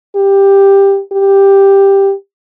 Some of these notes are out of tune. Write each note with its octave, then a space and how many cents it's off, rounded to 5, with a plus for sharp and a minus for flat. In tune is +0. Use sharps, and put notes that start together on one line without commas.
G4 +10
G4 +5